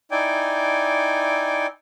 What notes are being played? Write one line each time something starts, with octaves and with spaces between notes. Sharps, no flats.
D#4 E4 D5 G5 G#5